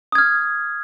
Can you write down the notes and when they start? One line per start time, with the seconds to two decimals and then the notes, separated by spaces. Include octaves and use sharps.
0.12 D#6
0.15 G#6
0.18 F6